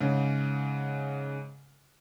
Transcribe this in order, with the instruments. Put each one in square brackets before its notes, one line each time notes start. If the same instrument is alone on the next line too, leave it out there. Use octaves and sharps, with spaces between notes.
[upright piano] G#2 C#3